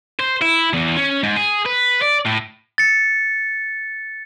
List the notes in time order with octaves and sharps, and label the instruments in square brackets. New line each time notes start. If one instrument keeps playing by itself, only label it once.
[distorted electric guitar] C5
E4
E2
C#4
G#2
G#4
B4
D5
A2
[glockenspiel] A6 C#7